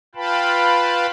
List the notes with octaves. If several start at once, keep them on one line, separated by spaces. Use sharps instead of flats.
F4 B4 F5 G5 A5 B5